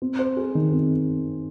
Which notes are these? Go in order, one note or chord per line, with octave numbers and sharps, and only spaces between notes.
C4
C5
G#4
D#3
C4